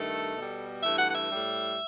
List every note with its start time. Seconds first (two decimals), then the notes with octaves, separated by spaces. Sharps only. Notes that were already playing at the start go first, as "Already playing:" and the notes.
Already playing: G2 D#3 A3 A4
0.36 B2 G3
0.83 G2 E3 A3 E5
0.99 F#5
1.10 F#5
1.15 E5
1.31 A2 G3